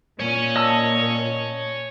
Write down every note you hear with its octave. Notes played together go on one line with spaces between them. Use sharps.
A#2 C#5 G#5
D#5 A5 E6